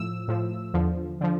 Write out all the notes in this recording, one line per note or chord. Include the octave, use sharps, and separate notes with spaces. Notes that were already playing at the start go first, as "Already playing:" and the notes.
Already playing: A2 F3 E6
A2 F3
E2 D3 F3
D3 F3